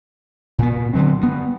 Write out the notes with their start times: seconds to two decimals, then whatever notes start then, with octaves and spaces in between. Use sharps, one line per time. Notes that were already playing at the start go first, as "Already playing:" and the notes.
0.58 A#2 B3
0.93 D3 E3 F#3 C4
1.21 G2 B3